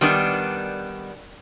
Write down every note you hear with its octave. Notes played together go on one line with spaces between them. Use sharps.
D#3 G3 B3 D4